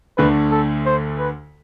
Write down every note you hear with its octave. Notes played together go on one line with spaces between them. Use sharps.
D2 D3 A3 B4
A4
C5
B4